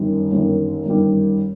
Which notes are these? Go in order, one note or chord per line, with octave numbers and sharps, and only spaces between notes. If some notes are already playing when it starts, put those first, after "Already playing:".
Already playing: G1 F#2 D#3 G3
G1 F#2 D#3 G3
G1 F#2 D#3 G3